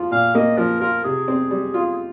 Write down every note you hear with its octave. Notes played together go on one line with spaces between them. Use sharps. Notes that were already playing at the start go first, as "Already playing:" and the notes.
Already playing: F3 F4
A#2 F5
A#3 D#5
F3 A#4
F4 A#4
C3 G#4
C4
G3
F4